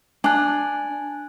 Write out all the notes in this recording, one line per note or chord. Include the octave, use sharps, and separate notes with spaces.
D4 G#5 A5 F#6